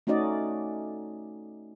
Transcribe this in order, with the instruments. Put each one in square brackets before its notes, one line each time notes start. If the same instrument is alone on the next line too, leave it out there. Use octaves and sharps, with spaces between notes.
[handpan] A3 C#4 D#4 F#4 D5 D#5